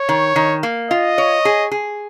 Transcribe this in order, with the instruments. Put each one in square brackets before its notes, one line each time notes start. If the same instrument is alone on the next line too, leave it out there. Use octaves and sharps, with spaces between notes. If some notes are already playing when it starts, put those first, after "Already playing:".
Already playing: [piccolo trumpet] C#5
[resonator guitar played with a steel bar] D#3
D#3
A#3
[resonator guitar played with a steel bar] F4 [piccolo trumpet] D#5
[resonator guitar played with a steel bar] C#5
G#4
G#4